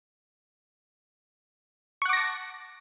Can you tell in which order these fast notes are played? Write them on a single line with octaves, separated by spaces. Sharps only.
C#6 F#5 D6 A#6 A5